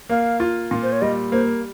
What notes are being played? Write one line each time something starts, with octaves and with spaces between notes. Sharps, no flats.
A#3 F5
F4
A#2
C5
C#5
G3 D#5
A#3 C5